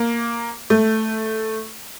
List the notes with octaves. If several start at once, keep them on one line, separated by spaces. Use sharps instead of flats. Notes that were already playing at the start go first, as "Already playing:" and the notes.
Already playing: A#3
A3